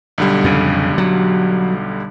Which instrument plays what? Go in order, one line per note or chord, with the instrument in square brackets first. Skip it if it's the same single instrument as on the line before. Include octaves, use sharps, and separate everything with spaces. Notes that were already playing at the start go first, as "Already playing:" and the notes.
[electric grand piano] B1 D3 G3
[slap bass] F2 C#3
F#3